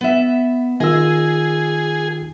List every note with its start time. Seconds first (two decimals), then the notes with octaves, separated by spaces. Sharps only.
0.01 B3 E5
0.80 D#3 F4 G#4 D#5 E6